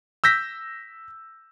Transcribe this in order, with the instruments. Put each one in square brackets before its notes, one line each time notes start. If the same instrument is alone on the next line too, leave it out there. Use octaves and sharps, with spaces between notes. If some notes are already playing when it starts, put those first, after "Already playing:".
[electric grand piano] E6 G6 A#6 B6